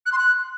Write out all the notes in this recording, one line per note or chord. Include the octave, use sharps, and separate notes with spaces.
F#6
C6
F#6